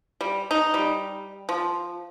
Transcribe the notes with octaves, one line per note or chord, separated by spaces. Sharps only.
G3
D#4
G3
F3